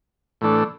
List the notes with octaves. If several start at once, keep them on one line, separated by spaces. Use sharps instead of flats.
A2 E3 A3 D4